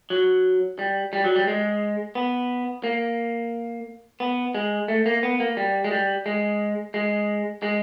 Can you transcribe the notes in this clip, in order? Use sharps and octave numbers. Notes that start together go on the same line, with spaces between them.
F#3
G3
G3
F#3
G3
G#3
B3
A#3
B3
G#3
A3
A#3
B3
A#3
G3
G#3
G3
G#3
G#3
G#3